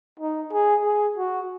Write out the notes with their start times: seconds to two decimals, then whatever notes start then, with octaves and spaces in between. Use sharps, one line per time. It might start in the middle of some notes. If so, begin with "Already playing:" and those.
0.20 D#4
0.52 G#4
0.84 G#4
1.18 F#4